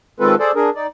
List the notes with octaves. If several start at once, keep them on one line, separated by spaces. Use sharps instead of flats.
D#3 G#3 C4 F4 A4 B4
G#4 A4 C5 D5
D4 G#4 A#4
D#4 D5